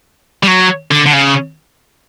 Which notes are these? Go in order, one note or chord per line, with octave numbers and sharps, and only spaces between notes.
G3
F#3
D3
D3
C#3